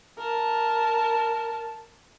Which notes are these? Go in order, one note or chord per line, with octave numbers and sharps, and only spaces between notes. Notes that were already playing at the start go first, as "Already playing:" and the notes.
A#4 A5